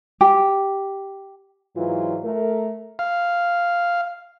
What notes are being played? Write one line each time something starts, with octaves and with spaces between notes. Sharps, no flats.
G4
G#2 E3 F#3 F4
A3 A#4
F5